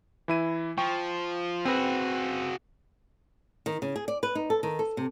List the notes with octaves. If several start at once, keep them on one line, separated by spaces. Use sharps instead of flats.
E3 E4 D#7
F3 G5 C#6
C4 F#4 G#4 B4
D#3
C#3
G#4
D5
B4
D#4
A4
D#3
A4
C3